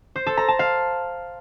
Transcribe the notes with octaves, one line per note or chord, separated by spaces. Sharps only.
C5
A4
A#5
A5
F5